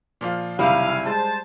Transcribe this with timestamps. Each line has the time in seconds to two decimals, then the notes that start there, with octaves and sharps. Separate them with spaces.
0.21 A#2 F3 F4
0.59 F#1 C3 D#3 G3 E4 F5 G#5
1.05 G#3 C5 A5